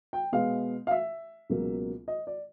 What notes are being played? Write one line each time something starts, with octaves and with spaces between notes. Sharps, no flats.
G5
B2 G#3 B3 F5
F5
E5
C#2 B2 F#3 A#3
D#5
D5